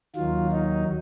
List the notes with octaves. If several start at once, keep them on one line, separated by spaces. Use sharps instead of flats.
D#2 D#3 F#3 F4
D#4